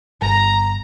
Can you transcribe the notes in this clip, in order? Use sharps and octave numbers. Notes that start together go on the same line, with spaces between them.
G1 A#5